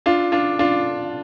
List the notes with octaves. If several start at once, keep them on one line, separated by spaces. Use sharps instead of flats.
D4 F4
D4 F4
D4 F4